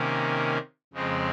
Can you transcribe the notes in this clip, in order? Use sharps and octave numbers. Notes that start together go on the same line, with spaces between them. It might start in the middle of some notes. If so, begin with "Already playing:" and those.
Already playing: C3 D#3 A#3 C#4
F2 C#3 G#3 C4